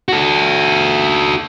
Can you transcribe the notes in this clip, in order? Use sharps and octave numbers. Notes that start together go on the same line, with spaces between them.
F#4 A4